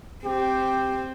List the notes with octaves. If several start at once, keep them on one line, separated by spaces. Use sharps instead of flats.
C4 G4